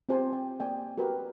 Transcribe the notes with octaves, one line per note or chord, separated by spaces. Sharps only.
C4 F4 G4 C5 G#5 A5
G5
A#3 D5 G5 G#5
F#4 G4 A#4 B4 G5